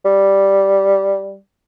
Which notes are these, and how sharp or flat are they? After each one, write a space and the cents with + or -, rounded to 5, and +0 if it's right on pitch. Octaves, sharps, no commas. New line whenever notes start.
G3 -5